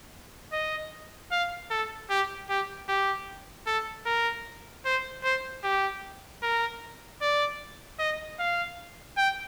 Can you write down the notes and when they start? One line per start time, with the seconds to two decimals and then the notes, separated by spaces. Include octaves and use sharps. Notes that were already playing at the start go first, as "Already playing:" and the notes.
0.52 D#5
1.32 F5
1.70 A4
2.10 G4
2.49 G4
2.89 G4
3.67 A4
4.06 A#4
4.85 C5
5.24 C5
5.63 G4
6.42 A#4
7.21 D5
7.99 D#5
8.39 F5
9.17 G5